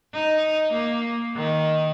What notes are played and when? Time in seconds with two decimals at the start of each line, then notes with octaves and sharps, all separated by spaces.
0.14 D#4
0.73 A#3
1.36 D#3